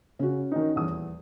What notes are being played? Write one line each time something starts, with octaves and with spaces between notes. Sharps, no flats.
C#3 C#4 F#4
D#3 D#4
D#1 E2 D#6